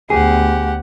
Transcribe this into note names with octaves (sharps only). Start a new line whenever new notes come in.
D2 B3 G4 G#4 F#5